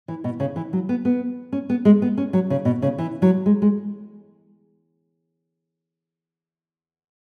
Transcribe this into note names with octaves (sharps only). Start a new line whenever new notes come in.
E3
B2
C#3
E3
F#3
B3
B3
C#4
B3
G#3
B3
C#4
F#3
C#3
B2
C#3
E3
F#3
G#3
G#3